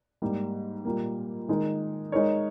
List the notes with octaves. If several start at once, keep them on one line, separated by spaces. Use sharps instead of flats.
G#2 G3 A#3
A#2 G3 A#3
D#3 G#3 D#4 A#4
G#3 D#4 A#4 C#5